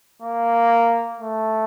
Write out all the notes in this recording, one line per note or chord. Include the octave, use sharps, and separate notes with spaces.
A#3
A3